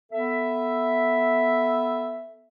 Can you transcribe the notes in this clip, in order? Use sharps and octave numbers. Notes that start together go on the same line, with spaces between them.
B3 A4 E5